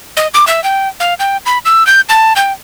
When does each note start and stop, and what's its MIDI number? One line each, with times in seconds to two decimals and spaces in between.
0.17 0.27 75
0.34 0.45 86
0.47 0.63 76
0.64 0.88 79
1.00 1.14 77
1.20 1.37 79
1.46 1.58 83
1.65 1.86 88
1.87 2.01 91
2.09 2.33 81
2.36 2.52 79